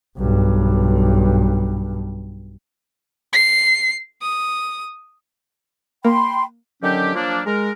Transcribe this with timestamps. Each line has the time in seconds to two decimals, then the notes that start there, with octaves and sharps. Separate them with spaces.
0.17 B1 G2
3.33 C7
4.22 D#6
6.05 A#3 G5 B5 C6
6.83 D3 D#3 F#3 C#4 G4
7.15 F3 F#3 A#3 D4
7.46 G#3 A#4